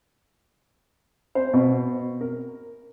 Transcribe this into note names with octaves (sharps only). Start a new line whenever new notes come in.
C5
B2
A#4